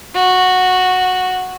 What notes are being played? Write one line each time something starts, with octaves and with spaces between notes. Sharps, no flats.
F#4